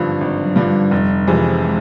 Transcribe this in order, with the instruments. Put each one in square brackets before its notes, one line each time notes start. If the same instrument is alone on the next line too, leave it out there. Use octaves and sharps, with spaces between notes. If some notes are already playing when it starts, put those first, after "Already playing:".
Already playing: [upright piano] G#1 G2 D3 F3
G#1
[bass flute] F#3
[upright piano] G2 D3 F3
[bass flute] G3
[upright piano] F1
F2 C3 E3 G#3
[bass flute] G#3